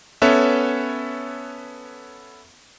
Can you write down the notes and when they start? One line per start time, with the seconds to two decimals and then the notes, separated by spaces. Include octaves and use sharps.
0.22 B3 C#4 A4 B4 C#5 E5